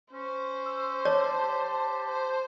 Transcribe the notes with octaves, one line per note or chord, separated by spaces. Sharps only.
C#4 C5
E6
C#5 D5 A5
G4
C5